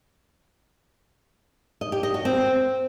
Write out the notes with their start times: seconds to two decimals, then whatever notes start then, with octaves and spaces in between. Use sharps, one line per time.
1.81 D#5
1.92 G4
2.03 D#5
2.14 F#4
2.25 C4